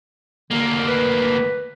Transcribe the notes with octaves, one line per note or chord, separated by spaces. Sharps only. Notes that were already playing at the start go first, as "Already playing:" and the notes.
D2 D3 A#3
B4